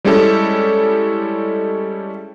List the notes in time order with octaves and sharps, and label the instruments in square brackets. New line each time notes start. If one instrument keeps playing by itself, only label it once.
[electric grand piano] G3 G#3 C#4 E4 G4 A4